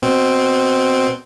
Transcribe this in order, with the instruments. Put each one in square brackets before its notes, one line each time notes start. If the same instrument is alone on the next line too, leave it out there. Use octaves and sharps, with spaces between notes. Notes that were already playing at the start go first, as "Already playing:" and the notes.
[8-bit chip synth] B2 C4